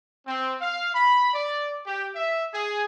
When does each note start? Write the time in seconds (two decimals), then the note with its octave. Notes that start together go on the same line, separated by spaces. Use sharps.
0.27 C4
0.61 F5
0.94 B5
1.34 D5
1.86 G4
2.15 E5
2.54 G#4